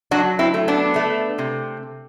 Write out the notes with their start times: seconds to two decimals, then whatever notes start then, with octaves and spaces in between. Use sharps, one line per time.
0.11 F#3 D4 F#4
0.39 C4 E4
0.54 A3
0.68 B3 D4
0.96 A3
1.38 C3